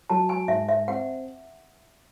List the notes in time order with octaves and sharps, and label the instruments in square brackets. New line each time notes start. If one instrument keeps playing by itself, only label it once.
[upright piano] F#3 [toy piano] A5
[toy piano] G#5
[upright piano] G#2 [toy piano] E5
[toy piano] E5
[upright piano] C4 [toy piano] F#5